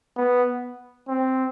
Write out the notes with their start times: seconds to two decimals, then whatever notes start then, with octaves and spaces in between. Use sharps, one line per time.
0.17 B3
1.09 C4